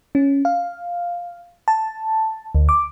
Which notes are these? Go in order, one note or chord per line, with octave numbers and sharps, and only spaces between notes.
C#4
F5
A5
D2
D6